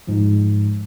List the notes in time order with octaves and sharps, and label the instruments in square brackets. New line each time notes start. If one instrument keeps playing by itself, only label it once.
[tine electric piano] G#2 F3